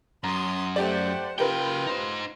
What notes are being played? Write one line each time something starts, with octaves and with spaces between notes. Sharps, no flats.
F#2 A#5 C6 D#6
A3 G4 C5 D5 F#5
C#3 F4 G4 A#4 B4 G5
D#4 C5